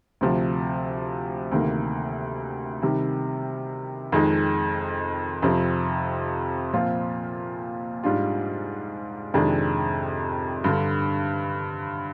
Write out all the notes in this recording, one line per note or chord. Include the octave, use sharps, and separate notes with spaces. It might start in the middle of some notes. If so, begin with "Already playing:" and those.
D2 C3 F3
D2 C3 D#3 A#3
C3 D#3 G3
F2 D#3 G#3 D#4
F2 C3 F3 C4
A#2 F3 C4 F4
G#2 G3 D4 F4
F2 C3 D#3 G#3 D4
G2 D3 G3